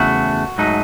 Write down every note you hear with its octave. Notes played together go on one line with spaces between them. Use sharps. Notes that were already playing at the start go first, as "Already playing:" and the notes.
Already playing: E2 C#3 E3 A3 F#4
G#2 F#3 A3 D#4